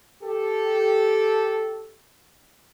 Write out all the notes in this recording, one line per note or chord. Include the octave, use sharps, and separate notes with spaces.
G4 A4